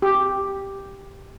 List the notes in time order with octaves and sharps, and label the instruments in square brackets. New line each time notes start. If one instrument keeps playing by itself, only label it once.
[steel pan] G4